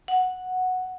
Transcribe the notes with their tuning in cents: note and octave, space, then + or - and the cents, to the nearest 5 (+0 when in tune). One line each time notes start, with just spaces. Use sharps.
F#5 -5